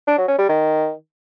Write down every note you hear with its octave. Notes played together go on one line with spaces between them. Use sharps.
D4
F#3
C#4
G3
D#3